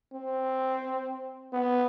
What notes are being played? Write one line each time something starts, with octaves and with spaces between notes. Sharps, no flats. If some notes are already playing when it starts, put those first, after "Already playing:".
C4
B3